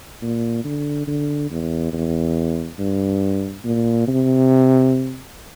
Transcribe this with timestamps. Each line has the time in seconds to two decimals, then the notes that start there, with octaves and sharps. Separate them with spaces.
0.22 A#2
0.65 D3
1.07 D3
1.51 E2
1.93 E2
2.79 G2
3.64 A#2
4.08 C3